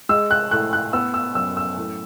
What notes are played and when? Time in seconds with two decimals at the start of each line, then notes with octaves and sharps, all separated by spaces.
0.09 G#3 E6
0.31 F#6
0.51 A2 F#6
0.73 F#6
0.93 B3 E6
1.14 E6
1.35 F#2 E6
1.57 E6
1.77 A2